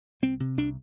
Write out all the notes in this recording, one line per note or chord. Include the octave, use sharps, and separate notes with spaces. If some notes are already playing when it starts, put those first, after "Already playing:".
C2 C4
C3
C2 D4